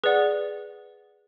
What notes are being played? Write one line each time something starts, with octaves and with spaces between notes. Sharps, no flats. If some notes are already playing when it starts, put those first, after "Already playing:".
G#4 B4 D5 F#5